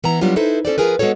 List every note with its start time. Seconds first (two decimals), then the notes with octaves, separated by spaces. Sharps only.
0.04 E3 B3 E4 A#5
0.21 F#3 G3 B3 D4 F4 G4
0.36 D#4 E4 A4 B4 C5
0.65 C#4 A4 C5 D5
0.78 F3 F4 G#4 A#4 B4
0.99 G#3 B3 F#4 A4 C#5